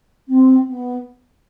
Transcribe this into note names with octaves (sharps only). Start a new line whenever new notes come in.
C4
B3